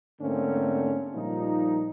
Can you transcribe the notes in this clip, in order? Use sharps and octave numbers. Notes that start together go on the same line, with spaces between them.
G#2 D3 A3 A#3 C4 C#4
A#2 F3 G3 D#4